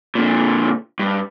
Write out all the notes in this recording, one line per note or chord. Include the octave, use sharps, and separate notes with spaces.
A#2 D3
G2